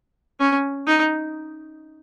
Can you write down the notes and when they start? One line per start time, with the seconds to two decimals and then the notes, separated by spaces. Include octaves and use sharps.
0.40 C#4
0.87 D#4